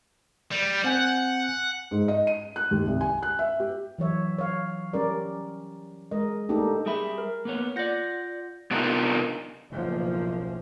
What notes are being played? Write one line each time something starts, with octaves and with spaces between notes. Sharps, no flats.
G3
C4 F#5 G#5 G6
G#2
D#5
D#7
F#6
D#2
C2
G#5
F#6
E5
G4
E3 F#3 C#5 E5
C#5 F5
G3 C#4 A#4 D5
G#3 A#4 D#5
A3 A#3 D4 D#4 G4 A4
G3 G4 G#4 E5 B5
A#4
A#3 B3 C#5
F4 D5 F#5 G6 A#6
C3 B3 D4 D#4 F4 A#4
F#1 B1 F3 A#3